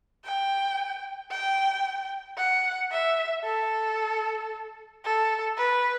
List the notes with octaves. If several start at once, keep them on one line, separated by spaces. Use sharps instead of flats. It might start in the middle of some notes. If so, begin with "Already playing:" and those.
G5
G5
F#5
E5
A4
A4
B4